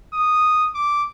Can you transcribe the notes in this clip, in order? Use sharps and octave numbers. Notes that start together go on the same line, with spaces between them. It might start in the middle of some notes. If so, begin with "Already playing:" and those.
D#6
D6